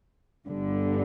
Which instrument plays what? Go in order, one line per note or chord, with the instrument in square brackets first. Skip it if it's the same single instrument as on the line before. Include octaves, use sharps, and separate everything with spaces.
[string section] G1 G2 D3